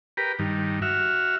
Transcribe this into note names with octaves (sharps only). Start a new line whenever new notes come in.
G4 A#4 B4
G2 D#3
F#4 E5 F6